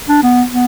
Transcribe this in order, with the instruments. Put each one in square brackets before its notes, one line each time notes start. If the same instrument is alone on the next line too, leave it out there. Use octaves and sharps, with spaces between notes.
[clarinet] D4
B3
B3